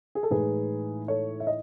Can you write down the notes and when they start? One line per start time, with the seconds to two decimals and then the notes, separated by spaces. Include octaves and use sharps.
0.15 G#4
0.23 A4
0.30 A2 E3 G#3 D#4 G#4 B4
1.08 A4 C#5
1.40 E5
1.47 D#5